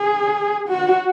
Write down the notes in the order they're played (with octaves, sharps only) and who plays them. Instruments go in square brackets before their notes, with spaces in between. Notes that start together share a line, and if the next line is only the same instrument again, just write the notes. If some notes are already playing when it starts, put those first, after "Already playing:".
Already playing: [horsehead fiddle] G#4
F#4